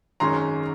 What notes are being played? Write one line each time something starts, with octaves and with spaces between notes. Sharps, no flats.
G#1 F#2 D#3 G#3 C#4 A#5 C6